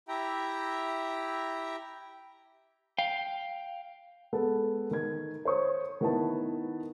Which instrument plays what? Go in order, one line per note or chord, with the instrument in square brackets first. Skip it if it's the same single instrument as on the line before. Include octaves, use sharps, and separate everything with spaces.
[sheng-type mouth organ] E4 G4 E5 G5 A#5
[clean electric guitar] F5 G5
[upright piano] G#3 B3 A4 B4
D#3 G#6
C5 C#5 C#6 D#6
D#3 B3 E4 B4 A5